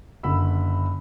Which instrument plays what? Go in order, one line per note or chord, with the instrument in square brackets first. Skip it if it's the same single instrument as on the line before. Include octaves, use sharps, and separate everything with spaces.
[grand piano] F#1 D3 B5 E6